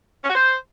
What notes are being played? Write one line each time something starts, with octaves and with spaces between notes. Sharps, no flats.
C#4
F#4
C5